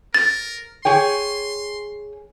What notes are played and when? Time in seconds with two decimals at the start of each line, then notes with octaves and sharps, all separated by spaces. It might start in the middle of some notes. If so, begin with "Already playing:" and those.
0.14 A#4 A6
0.85 G#4 C#5 G5 C6